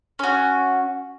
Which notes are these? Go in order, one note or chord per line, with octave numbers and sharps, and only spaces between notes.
C#4 F#4